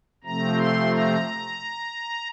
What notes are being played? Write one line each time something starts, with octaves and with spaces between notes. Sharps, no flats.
C3 F3 A3 C4 A#5
C6
A#5